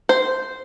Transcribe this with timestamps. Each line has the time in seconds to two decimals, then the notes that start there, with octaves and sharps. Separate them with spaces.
0.09 C5